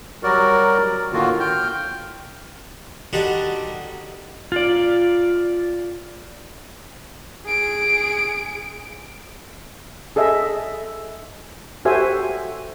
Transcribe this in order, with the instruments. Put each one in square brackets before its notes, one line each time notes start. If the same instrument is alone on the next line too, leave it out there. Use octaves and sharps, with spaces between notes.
[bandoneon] F#3 G3 F#4 A#4 D5
A2 D3 D#3 A#3 F4 F#4
G5 F6 G6
[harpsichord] D3 G3 D4 D#4 F#4
[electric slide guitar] F4 D5
[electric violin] G#4 D7
[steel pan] G#4 A4 D#5 E5
F#4 G4 A4 C5 E5 G#5